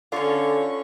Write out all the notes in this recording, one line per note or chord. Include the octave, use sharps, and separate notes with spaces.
D3 C#4 F4 A4 C#5 C#6